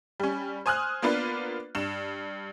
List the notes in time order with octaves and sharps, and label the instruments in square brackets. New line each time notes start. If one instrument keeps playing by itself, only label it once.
[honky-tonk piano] G3 C#4
C5 G#5 D#6 F6 F#6
A#3 B3 D4 F4 B4
G2 E7